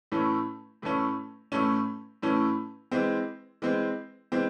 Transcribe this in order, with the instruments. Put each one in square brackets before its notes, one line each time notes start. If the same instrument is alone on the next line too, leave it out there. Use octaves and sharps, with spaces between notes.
[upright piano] A2 E3 A3 C#4
A2 E3 A3 C#4
A2 E3 A3 C#4
A2 E3 A3 C#4
E3 G#3 C4
E3 G#3 C4
E3 G#3 C4